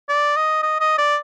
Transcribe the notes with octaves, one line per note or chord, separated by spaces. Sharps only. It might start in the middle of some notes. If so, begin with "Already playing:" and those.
D5
D#5
D#5
D#5
D5